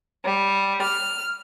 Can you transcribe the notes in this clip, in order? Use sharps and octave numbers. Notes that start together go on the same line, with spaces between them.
G3
F6